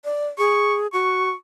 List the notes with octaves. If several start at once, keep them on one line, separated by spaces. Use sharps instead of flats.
D5
G#4 C#6
F#4 C#6